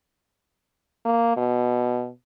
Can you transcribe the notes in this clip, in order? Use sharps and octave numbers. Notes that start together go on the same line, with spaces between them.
A#3
B2